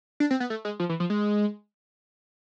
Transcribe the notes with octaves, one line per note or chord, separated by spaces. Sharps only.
D4
C4
B3
A3
G#3
F3
E3
F3
G#3